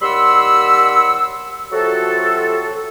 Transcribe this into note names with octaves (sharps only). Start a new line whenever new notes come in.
D#2 G3 F#5 B5 C6 E6
C3 F#3 F4 F#4 A4